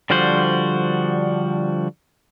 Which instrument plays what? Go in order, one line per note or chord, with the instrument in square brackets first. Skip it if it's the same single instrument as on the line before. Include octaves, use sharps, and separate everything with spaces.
[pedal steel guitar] D3 F3 G3 F#4 C5